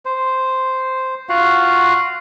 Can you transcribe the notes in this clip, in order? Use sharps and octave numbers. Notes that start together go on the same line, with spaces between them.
C5
F4 F#4 F5 F#5